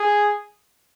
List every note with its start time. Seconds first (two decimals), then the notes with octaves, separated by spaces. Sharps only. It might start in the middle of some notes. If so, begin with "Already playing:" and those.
Already playing: G#4